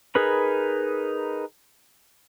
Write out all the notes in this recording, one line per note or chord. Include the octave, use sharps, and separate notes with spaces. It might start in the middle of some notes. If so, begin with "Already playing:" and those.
D#4 G#4 A#4 B4 B5